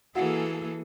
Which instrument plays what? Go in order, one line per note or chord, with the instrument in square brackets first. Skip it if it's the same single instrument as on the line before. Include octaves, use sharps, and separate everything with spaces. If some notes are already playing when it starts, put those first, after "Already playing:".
[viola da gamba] E3 [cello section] A#3 G#4 A4 [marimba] F#4 F5 F#5